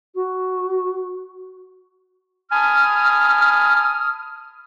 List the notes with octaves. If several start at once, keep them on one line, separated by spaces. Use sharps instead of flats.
F#4
G#5 A5 B5 D#6 F6